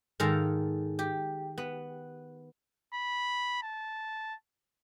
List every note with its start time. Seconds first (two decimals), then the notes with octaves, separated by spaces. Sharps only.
0.20 G#2 D#3 A4 F5 A#5
0.99 G4
1.58 B3
2.94 B5
3.63 A5